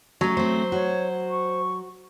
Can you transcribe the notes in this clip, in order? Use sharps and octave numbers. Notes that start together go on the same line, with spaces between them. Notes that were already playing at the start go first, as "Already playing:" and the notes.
F#3 A3 C#4
A3 C4 C5
F#4 C#5
C#6